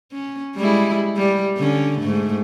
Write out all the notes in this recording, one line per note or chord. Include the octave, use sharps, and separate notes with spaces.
C#4
G3 G#3 E4
G3
D3 C#4
G#2 A3